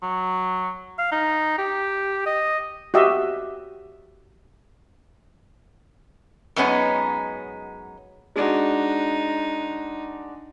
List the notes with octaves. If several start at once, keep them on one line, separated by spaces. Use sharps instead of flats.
F#3
F5
D#4
G4
D#5
F#4 G4 D#5 E5
F#2 G#3 B3 C#4 D#4
G#3 D4 D#4 F#4